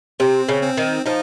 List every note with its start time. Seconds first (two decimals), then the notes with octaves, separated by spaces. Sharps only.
0.20 C3 C4
0.48 C#3
0.63 C4
0.77 D#3
1.06 F3 D#4